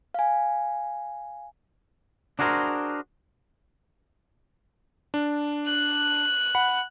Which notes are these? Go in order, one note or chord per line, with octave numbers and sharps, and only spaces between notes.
F5 G#5
D4 F#4 G#4 A#4 C5
D4
F#6
F#5 B5